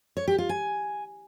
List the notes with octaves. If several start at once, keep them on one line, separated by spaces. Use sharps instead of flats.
C#5
G4
F4
G#5